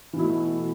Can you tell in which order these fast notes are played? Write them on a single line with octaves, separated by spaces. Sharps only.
E3 B2 E4 A3